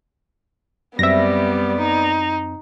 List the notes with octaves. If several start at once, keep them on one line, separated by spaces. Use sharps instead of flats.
F#2 G3 B3 C4 D5 E5 A#6
D#4